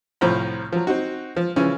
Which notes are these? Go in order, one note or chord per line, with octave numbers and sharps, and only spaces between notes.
C2 A2 F3 C4 A#5 B5
F3 F#3
C4 D#4 F#4
F3
C#3 E3 F3 C#4